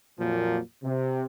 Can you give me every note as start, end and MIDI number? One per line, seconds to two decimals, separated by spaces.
0.19 0.59 41
0.19 0.59 46
0.19 0.59 53
0.19 0.59 54
0.19 0.59 58
0.83 1.25 48